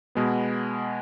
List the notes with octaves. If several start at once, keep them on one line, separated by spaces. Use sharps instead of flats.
B2 G#3 B3